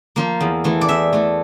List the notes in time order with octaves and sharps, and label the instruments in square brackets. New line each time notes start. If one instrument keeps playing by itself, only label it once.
[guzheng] F3 A#3
E2
E3 A3
D5
E2 E5
E3 A3